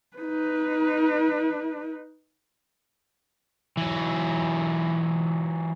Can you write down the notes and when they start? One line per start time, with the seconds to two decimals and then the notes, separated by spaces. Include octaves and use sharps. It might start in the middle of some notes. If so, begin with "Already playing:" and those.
0.17 D#4 B4
3.77 E3 F#3